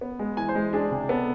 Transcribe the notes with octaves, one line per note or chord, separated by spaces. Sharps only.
B3
G#3
E3 G#5
C5
G#3
D4 G#4
C3
B3 A4